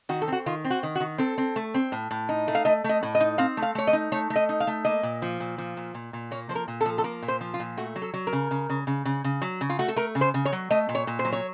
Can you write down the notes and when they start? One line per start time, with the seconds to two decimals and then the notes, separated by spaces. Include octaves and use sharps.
0.09 D#3 F#4
0.22 A4
0.28 C4 F#4
0.46 D#3 F4
0.65 C4
0.70 F#4
0.83 D#3
0.95 F#4
1.00 D#3
1.18 C4 A4
1.38 C4
1.56 A3
1.74 C4
1.92 A2
2.11 A2
2.29 D#4
2.48 A3
2.55 F5
2.65 A3 D#5
2.84 A3 D#5
3.03 A2
3.15 D#5
3.21 D#4
3.38 C4 F5
3.57 A3
3.62 F5
3.75 A3 C#5
3.87 D#5
3.93 D#4
4.12 A3 C#5
4.30 A3
4.36 D#5
4.49 D#4
4.60 F5
4.67 A3
4.85 A#3 D#5
5.03 A#2
5.22 F3
5.40 A#2
5.58 F3
5.77 A#2
5.94 A#2
6.13 A#2
6.31 A#3 C#5
6.49 F3 C5
6.55 A#4
6.68 A#2
6.81 A4
6.86 F3
6.98 A4
7.04 A#3 A#4
7.22 A#2
7.28 C5
7.41 F3
7.54 F4
7.60 A#2
7.77 A3 F#4
7.96 F#3
8.02 A4
8.14 F#3
8.27 A#4
8.33 C#3
8.51 C#3
8.70 C#3
8.87 C#3
9.05 C#3
9.24 C#3
9.42 F#3
9.61 C#3
9.70 F4
9.79 A3 F#4
9.88 A4
9.96 A3 A#4
10.15 C#3
10.21 C5
10.34 C#3
10.45 C#5
10.52 F#3
10.71 A3 D#5
10.89 A#2
10.95 C#5
11.07 A#2
11.19 C5
11.25 F#3
11.33 C#5